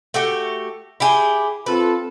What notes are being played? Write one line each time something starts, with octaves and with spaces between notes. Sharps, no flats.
A3 F#4 G4
E4 G4 G#4
C4 F4 A4 B4